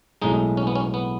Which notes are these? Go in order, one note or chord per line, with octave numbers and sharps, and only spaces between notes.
B1 A2 G#3 D#4
C#4
B3
C#4
B3